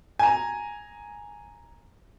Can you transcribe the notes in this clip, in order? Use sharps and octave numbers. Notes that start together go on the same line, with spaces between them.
G#5 A#5